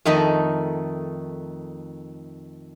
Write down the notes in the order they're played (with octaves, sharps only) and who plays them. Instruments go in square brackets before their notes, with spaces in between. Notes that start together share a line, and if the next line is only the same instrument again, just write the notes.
[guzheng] F2 D#3 A3 D#4 D#5 B5